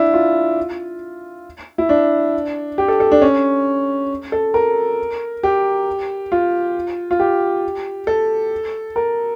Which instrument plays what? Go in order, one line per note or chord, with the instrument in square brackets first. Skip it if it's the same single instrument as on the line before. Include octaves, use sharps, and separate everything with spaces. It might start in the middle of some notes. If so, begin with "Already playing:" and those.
Already playing: [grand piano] D4 E4
F4
E4
D4
G4
A4
A4
D4
C#4
A4
A#4
G4
F4
F4
G4
A4
A#4